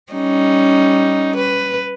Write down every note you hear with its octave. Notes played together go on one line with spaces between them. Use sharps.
G3 C#4 D#4
B4